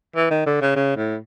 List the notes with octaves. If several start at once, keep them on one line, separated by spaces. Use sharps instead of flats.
E3
D#3
D3
C#3
C#3
A2